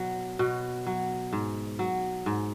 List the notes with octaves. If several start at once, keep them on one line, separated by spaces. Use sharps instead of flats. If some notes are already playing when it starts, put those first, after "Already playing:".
Already playing: B2 F#3
B2 F#4
F#3
G#2
F#3
G#2